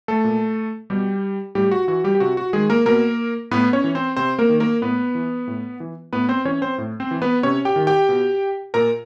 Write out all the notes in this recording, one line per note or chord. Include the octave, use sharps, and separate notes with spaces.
A3 A4
A#2
B2 G3 G4
A2 G3 G4
F#4
E3 F#4
G3 G4
G4
C3 F#4
F#4
D#3 G#3 G#4
A#3 A#4
B2 A#3 A#4
A2 B3 B4
C#4 C#5
E3
C4 C5
C3 C4 C5
A#3 A#4
D#3
A#3 A#4
A2 B3 B4
E3
A2
E3
A2 B3 B4
C4 C5
E3 C#4 C#5
C4 C5
A2
C4 C5
E3
B3 B4
C3 C#4 C#5
G4 G5
D#3
G4 G5
B2
A#2 A#4 A#5